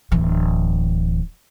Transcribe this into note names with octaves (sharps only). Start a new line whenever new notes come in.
D1 E3